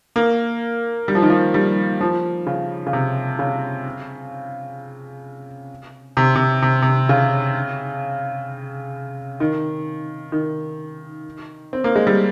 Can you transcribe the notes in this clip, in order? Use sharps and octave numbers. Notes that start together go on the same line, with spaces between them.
A#3
G3
F3
D#3
F3
G3
F3
C#3
C#3
C3
C#3
C3
C3
C3
C3
C#3
D#3
D#3
C4
A#3
G#3
G3